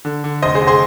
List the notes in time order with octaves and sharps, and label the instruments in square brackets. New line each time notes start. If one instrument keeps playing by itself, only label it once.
[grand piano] D3
D3
F1 C5 D#5
G#4 C5
F1
G#4 C5